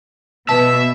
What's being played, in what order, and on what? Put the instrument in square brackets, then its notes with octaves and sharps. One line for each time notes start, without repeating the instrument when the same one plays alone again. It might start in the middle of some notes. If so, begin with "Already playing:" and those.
[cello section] B2 [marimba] B4 A5 [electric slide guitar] E5